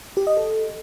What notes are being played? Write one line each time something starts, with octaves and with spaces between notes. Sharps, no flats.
G4
D#5
A4